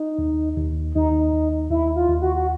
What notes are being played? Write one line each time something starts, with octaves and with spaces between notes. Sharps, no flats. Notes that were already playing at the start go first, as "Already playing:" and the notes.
Already playing: D#4
D#2
D#2
D#2 D#4
D#2
D#2 E4
F4
D#2
F#4
F#4